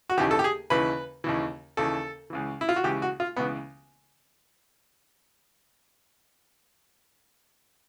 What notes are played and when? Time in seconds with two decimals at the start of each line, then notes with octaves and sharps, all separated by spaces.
0.10 F#4
0.18 D#2 C#3 E3 G4
0.31 A4
0.39 G4
0.44 G#4
0.70 D#2 C#3 E3 B4
1.24 D#2 C#3 E3
1.77 D#2 C#3 E3 A4
2.30 C#2 C#3 E3
2.61 E4
2.69 F4
2.76 F#4
2.84 C#2 C#3 E3 G4
3.02 F#4
3.20 F4
3.36 C#2 C#3 E3 B3